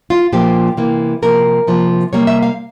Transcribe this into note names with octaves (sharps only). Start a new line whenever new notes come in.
F4
A#2 F3 A#3 G4
C3 E3 A#3
C3 F3 A#3 A#4
C3 F3 A#3
C3 G3 A#3 C#5
E5
F5